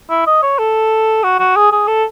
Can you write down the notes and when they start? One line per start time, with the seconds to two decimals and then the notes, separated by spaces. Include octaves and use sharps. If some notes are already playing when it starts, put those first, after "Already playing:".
0.10 E4
0.27 D#5
0.43 C#5
0.59 A4
1.24 F#4
1.40 F#4
1.57 G#4
1.72 G#4
1.88 A4